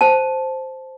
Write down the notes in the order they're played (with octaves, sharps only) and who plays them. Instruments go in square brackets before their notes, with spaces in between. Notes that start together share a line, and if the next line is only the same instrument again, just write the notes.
[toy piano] C5 A5